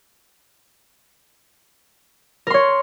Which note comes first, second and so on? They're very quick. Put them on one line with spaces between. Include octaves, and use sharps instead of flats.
A#4 C6 C#5